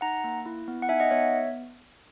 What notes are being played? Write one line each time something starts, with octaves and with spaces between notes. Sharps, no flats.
D#4 F#5 A#5
A#3
E4
B3
F#5
D#4 E5 G#5
D#5 F#5
B3 C#5 E5